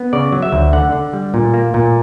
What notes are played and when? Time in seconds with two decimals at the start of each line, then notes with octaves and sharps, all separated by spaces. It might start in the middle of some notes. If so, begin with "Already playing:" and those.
Already playing: B3
0.13 C#3 D5
0.32 F#3
0.42 E5
0.52 D2
0.73 D3 F#5
0.92 D3
1.13 G3
1.34 A#2
1.54 A#3
1.74 A#2